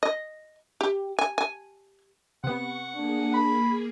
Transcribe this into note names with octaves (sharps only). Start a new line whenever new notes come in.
D#5
G4
G#5
G#5
C3 B3 F#5 C#6
A#3 D4 G#4
B5